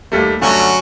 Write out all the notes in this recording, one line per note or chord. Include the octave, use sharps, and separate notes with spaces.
D#2 G3 A3
G2 D3 F#3 A3 C#4